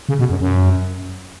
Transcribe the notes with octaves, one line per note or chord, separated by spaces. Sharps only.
C#3
B2
F#2
F#2